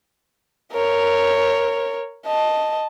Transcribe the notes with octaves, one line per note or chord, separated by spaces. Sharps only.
A#4 C#5
D#5 A5